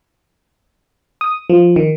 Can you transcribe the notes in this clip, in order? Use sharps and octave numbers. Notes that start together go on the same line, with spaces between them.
D#6
F3
D#3